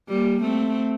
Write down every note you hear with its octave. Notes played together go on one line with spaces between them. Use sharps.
G3 A#3
A3 C4